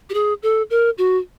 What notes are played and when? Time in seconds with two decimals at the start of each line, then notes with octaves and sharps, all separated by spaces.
0.10 G4
0.14 G#4
0.43 A4
0.70 A#4
0.98 F#4